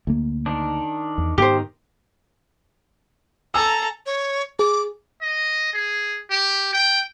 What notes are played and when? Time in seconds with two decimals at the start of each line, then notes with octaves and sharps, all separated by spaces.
0.07 D2 A#3
0.46 D#3 D4
1.18 E2
1.38 G#2 D#3 B3 G4 C5
3.54 A4 G#5 A#5 E6
4.06 C#5
4.59 G#4 D6
5.22 D#5
5.73 G#4
6.30 G4
6.73 G5